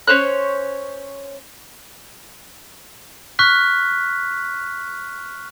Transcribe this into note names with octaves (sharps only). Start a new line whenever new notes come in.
C#4 C5 C#5 F#6
C#6 F6 F#6 B6